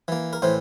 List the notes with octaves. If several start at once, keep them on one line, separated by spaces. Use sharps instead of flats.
E3 A#3
A#4
A2 E3 C5